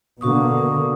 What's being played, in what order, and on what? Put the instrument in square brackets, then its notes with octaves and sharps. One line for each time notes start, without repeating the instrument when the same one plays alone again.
[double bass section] B2 D3 A#3 [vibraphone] F#4 C#6 D#6